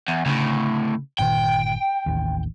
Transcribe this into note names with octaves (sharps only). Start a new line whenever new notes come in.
E2
D2 A2 C#3
G1 A#2 D#3 G5
A1 D#2